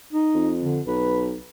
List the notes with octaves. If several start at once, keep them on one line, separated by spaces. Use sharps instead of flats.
D#4
F2
D3
B1 B4